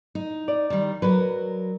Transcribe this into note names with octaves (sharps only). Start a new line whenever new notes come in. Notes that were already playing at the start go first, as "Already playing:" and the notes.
D#4
D5
D#3 G3
F#3 A#4 B4